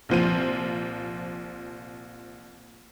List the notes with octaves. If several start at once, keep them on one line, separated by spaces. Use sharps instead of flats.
C2 A#2 F3 C5 D#7